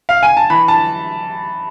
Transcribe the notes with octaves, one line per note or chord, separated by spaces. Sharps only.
F5
G#5
A5
E3 B5
A5